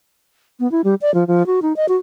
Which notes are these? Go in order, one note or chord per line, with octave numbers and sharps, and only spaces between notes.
B3
E4
G3
D5
F3
F3
F#4
D#4
D#5
F#4